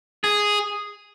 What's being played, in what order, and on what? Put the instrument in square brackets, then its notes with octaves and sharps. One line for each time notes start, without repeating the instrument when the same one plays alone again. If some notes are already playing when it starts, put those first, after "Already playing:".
[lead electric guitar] G#4